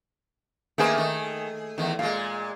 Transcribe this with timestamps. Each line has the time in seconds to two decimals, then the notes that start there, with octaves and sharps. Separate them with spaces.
0.78 D#3 A3 A#3 G#4 B4
0.98 D#3
1.78 E2 D#3
1.99 A#2 G#3 F5